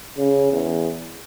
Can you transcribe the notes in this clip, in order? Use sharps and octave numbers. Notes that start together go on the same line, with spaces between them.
C#3
E2